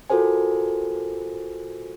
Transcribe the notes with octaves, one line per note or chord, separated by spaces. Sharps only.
F4 F#4 A4 A#4 C5 G#5